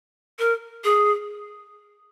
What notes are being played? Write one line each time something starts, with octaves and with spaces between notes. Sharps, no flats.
A#4
G#4